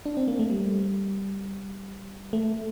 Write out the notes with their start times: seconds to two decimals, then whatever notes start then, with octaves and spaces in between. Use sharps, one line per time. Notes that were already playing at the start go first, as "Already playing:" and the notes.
0.06 D4
0.17 C4
0.28 A#3
0.39 A3
0.50 G3
2.33 A3